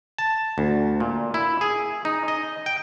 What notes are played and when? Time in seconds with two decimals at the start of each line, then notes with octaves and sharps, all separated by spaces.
0.18 A5
0.58 D2
1.00 A#2
1.34 E4
1.61 G#4
2.05 D#4
2.28 D#5
2.66 G5